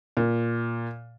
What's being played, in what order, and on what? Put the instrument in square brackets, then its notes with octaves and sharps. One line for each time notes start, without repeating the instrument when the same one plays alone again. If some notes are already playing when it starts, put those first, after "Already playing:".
[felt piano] A#2